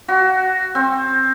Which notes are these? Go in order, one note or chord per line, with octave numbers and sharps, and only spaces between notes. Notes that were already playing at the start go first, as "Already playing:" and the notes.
F#4
C4